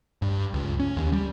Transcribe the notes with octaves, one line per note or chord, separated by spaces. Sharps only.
G2
C#2
C#4
D#2
G3